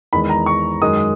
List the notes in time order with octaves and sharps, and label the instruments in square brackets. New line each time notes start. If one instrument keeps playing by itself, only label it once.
[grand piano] E2 D#3 G#3 B5
A#5
C#6
F#2 D#3 G#3 D#6